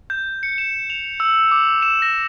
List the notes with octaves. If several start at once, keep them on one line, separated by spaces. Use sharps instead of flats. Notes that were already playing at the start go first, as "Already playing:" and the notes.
G6
C#7
E7
F7
E6
D6
E7
A#6